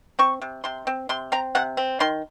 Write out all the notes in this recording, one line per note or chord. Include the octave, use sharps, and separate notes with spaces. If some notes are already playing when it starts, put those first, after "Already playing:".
C4 C#6
C3
C3 C6
C4
C3 C6
C4 A#5
C3 F#5
C4
D#3 C6